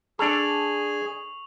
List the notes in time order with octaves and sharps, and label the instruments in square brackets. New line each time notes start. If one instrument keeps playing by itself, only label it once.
[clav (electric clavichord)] D4 A4 [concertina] G#4 [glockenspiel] C#6 F7 F#7